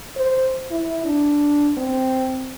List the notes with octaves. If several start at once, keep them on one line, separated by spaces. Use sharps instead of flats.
C5
E4
D4
C4